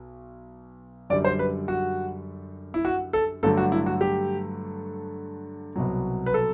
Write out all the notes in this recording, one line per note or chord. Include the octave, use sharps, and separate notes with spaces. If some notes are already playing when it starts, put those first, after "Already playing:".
Already playing: B1
F#2 D3 G3 D5
C5
B4
F#4
E4
F#4
A4
G2 D3 F#3 A3 A4
F#4
E4
F#4
G4
C2 B2 F#3
B4
A4